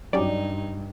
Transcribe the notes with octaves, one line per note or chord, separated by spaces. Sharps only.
G2 F#3 C#4 D#4 G4 D5